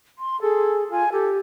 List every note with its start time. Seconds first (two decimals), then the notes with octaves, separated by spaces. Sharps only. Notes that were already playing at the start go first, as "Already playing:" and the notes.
0.18 C6
0.42 G#4 A4
0.91 F4 G#5
1.12 G4 A4